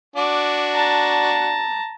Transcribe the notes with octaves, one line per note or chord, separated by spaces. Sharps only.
D4 F#4 D6
A5 A#5